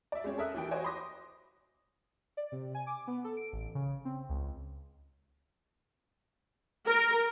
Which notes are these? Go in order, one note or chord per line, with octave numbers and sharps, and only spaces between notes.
D5 E5
G#3 C4 C#4 C#5
A4 A#4 E5 D#6 F#6
D#2 E3 G5
F#4 C5 C#5 D#5 G#5
C6 D6 D#6 A#6
D5
C3
G#5
D6
B3
A4
D7
A1
C#3
C4
C#2
A#4